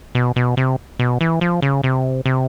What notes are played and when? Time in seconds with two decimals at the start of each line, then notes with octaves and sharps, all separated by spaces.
0.15 B2
0.36 B2
0.57 C3
0.99 B2
1.21 E3
1.41 F3
1.62 C#3
1.84 C3
2.26 C3